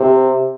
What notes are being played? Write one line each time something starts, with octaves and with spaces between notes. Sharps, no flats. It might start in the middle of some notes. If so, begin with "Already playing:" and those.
Already playing: C3